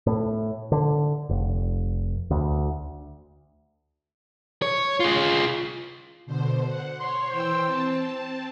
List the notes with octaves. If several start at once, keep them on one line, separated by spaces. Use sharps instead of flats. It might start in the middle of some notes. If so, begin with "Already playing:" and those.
A2
D3
F1
D2
C#5
F4 G#4
B2 D3 C5
F#5
C#5 C6
E3 C5 G5 E6
C4 A5